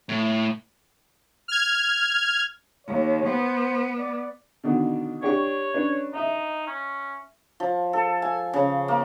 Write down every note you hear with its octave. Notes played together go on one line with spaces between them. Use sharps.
A2
F6 G#6
D#2 C#5
B3 C5
D5
B2 D3 D#3
D4 G4 C#5 C#6
C#4 D4 B4
D#4 D#5 E5
C#4
F3
A4
G#5
C#3
A#3